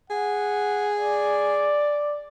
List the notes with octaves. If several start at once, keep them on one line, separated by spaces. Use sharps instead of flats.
G#4 F#5
D5